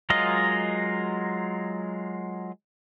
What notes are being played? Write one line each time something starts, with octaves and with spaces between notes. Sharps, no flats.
F#3 G#3 F4 A#4 D#5